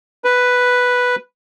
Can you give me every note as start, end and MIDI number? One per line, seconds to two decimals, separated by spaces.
0.24 1.16 71